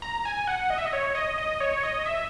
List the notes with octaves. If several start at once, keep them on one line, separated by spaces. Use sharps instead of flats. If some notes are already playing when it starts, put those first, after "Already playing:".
A#5
G#5
F#5
D#5
E5
D#5
C#5
D#5
D#5
C#5
D#5
E5